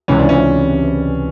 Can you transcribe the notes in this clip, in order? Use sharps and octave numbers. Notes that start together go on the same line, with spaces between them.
C#2 C3 E3 C#4
D4
C#4